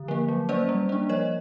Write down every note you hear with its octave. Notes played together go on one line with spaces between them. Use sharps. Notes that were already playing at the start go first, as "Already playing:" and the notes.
Already playing: D3
F3 A#3
F#3
A#3 C#4 C5 D5
G3
A#3 D4
F3 C#5 D#5